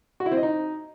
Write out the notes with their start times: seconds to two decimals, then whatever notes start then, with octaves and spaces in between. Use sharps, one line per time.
0.20 F#4
0.26 E4
0.31 C4
0.37 D#5
0.43 D#4